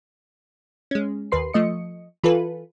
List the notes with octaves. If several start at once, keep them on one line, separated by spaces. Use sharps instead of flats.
G#3 C#4
D#2 B4 C6 C7
F3 A3 D#5 C#7
E3 F4 A4 B4